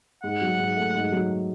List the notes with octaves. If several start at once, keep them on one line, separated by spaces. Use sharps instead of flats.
G#2 F#5
F#3
G#2
A3
G#2
F#3